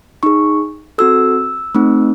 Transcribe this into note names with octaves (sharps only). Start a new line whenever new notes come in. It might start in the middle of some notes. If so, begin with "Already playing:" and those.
D#4 G#4 C#6
C4 F#4 A4 E6
A3 C4 D#4